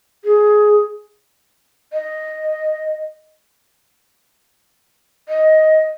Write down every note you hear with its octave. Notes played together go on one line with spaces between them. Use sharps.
G#4
D#5
D#5